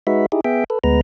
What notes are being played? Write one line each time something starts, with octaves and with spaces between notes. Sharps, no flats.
G#3 D#4 F#4 B4 E5
D#4 E4 G4 G#4
B3 G#4 E5 G5
A4 B4
D2 G#3 B3 B4 A#5